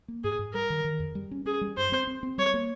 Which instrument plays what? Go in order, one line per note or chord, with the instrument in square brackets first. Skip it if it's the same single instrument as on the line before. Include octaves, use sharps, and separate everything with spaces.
[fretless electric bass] A#3
[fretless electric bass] G#2 [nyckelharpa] G#4
[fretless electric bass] G#2
[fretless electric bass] G3 [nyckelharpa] A#4
[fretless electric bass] D#3
D#3
F2
G3
C#4
[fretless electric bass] C#4 [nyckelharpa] G#4
[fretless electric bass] G3
[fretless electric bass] G2 [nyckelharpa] C5
[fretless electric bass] C4
C4
C4
[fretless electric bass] G3 [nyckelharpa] C#5
[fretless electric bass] A#3